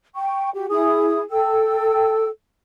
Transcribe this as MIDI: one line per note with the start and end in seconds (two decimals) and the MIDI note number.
0.15 0.50 79
0.15 0.50 85
0.54 0.67 66
0.54 0.67 67
0.70 1.20 64
0.70 1.20 68
0.70 1.20 87
1.31 2.27 69
1.31 2.27 79
1.31 2.27 88